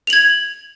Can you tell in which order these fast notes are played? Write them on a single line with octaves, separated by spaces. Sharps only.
F7 F#7 G#6